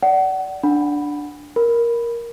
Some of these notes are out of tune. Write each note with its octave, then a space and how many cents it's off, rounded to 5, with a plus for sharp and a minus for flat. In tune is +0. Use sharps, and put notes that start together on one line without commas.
D5 -15 F#5 +30
D4 +0 F#5 -15 B5 +0
A#4 +10 B5 +0